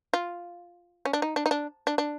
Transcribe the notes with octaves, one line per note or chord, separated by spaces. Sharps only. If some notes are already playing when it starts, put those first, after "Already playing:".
F4
C#4
D4
D#4
D4
D#4
D4
D4
D4